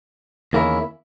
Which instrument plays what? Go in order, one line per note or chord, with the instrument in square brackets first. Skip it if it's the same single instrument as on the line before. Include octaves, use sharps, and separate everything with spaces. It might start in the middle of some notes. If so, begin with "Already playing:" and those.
[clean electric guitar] E2 D#3 A#3 C#4 E4